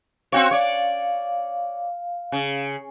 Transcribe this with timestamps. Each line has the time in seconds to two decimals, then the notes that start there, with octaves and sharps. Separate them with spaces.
0.32 C4 F#4 C#5 F5
0.51 C#5 D5
2.32 C#3